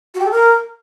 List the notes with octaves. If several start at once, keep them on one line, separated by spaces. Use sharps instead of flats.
F#4
G4
A4
A#4